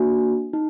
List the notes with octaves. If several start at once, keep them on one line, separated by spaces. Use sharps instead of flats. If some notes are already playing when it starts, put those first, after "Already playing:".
Already playing: A#3 D4 F#4
D#4